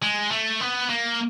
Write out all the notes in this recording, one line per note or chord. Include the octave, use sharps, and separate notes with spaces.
G#3
A3
B3
A#3